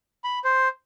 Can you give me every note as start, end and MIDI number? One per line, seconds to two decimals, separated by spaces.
0.24 0.39 83
0.45 0.68 72